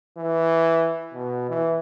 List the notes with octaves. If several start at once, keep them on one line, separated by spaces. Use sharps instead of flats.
E3
B2
E3